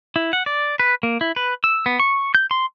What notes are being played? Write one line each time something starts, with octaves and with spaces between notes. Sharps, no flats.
E4
F#5
D5
B4
A#3
E4
B4
E6
B3
C#6
G6
C6